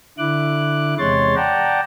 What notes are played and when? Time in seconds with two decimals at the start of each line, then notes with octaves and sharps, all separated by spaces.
0.18 D3 E4 D6 F#6
0.98 E2 C3 G#3 C#5 C6 A6
1.36 D5 F#5 G5 A5 A#5